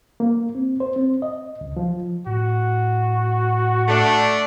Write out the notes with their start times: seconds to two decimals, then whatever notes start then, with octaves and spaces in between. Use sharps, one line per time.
0.20 A#3
0.55 C4
0.80 C5
0.96 C4
1.22 D#5
1.61 C#2
1.77 F3
2.27 A2 F#4
3.88 A3 D4